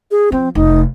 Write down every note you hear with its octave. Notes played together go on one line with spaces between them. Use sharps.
G#4
F3 C4
F1 D#4